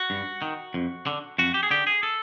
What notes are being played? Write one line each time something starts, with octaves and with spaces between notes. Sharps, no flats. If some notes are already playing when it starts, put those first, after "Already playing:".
Already playing: F#4
G2
D#3
F2
D3
F2 F#4
G4
G#4
D3 G4
G#4
A4